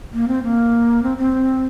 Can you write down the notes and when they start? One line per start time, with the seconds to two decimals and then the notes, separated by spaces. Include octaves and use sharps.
0.13 A#3
0.28 C4
0.43 A#3
1.03 C4
1.18 C4